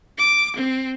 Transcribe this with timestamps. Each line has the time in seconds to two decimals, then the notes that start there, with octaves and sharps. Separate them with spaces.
0.18 D6
0.56 C4